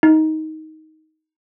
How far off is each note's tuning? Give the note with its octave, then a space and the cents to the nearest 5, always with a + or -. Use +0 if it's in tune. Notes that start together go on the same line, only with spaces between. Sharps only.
D#4 +15